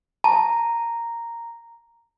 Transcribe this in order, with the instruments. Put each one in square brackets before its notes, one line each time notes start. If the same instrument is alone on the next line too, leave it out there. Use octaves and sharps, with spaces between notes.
[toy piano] A5 [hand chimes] A#5